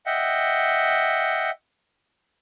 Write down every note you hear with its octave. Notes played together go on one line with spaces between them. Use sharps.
D#5 E5 F#5 G5